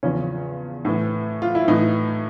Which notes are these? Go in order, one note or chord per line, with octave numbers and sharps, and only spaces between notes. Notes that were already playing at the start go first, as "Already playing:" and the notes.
E2 C#3 F3 C#4
A2 E3
F4
E4
A2 E3 D#4